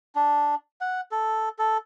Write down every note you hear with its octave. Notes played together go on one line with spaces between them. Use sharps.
D4
F#5
A4
A4